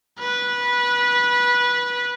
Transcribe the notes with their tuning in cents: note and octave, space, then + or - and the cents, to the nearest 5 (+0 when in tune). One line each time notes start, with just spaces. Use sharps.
B4 -15